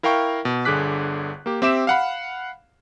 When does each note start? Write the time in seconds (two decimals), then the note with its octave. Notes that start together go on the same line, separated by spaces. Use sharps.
0.03 E4 A#4 F5 G5 C#6
0.45 B2
0.65 G1 D3 G#4 D6 F#6 B6
1.46 A#3 G4
1.62 C4 G4 E5 D6 E7
1.87 F5 F#5 B5